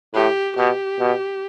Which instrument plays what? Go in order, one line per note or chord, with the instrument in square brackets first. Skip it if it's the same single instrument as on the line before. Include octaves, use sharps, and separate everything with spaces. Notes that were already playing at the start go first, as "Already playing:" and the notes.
[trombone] A2 [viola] G4
[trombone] B2 [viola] G4
[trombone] B2